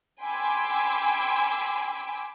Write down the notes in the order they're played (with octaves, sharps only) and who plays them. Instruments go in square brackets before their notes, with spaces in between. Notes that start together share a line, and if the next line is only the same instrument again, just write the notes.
[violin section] G5 G#5 B5 C6 D6 E6